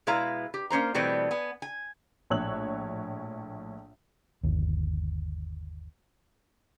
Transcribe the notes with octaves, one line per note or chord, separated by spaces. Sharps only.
B2 G#3 E4 B4 F5 A#5
G4
A#3 C#4 C5 A#5
B2 E3 G3 A3 B3 C4
B3 G#5
G#5
A#1 A2 C#5 E6 F#6 F#7
G1 D#2